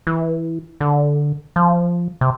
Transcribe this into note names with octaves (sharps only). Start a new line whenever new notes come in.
E3
D3
F3
C3